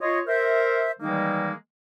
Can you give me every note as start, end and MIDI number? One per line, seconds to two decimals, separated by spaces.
0.01 0.19 65
0.01 0.19 73
0.01 0.19 75
0.27 0.91 70
0.27 0.91 72
0.27 0.91 76
1.00 1.51 51
1.00 1.51 52
1.00 1.51 55
1.00 1.51 56
1.00 1.51 58
1.00 1.51 63